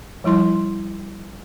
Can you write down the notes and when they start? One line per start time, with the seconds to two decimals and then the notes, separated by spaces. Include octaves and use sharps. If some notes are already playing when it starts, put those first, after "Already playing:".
0.24 F3 G3 E4 C6